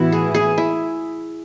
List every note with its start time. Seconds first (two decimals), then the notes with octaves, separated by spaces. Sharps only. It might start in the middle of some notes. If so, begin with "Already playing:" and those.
Already playing: A2 E3 B3 E4 F#4
0.12 G#4
0.34 G#4
0.58 E4